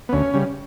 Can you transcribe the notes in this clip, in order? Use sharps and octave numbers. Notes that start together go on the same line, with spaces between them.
B3
D2 C#4
C#3 G3